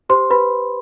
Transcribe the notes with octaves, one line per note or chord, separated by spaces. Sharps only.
G4 C5 C6
G4 B4 B5